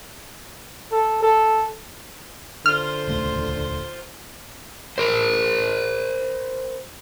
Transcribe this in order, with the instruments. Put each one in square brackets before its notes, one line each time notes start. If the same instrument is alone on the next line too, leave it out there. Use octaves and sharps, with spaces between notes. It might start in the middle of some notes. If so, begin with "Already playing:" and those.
[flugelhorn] A4
A4
[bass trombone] D3 [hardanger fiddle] F4 C5 [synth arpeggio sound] F6
[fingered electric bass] D#1 C#2 A3
[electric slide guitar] A#4 C5